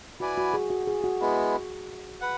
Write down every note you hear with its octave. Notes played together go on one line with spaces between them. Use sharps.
E4 F#4 B4 D5 G#5
F#4
G#4
F#4
G#4
F#4
G#3 B3 E4
B4 F#5